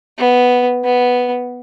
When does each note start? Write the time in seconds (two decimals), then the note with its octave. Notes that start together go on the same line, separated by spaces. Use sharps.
0.18 B3
0.84 B3